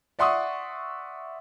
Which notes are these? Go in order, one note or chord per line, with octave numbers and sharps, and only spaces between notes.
D5 E5 F#5 C6 C#6 D#6